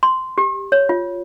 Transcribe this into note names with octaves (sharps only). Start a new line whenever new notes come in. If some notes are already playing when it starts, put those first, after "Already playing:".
C6
G4
C#5
F4